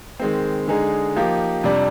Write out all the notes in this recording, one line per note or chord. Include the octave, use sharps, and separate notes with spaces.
D#3 G#3 C4
D3 G#3 D#4 G#4
F3 A#3 D#4 G4
F2 C3 G3 D4